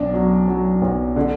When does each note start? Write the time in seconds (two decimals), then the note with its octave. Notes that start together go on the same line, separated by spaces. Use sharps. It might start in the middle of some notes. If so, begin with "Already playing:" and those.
Already playing: B1 D4
0.14 F#3
0.48 F#3
0.82 B1
1.16 D3